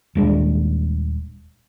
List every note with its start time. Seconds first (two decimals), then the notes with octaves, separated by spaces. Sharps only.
0.15 D#1 G#3 D4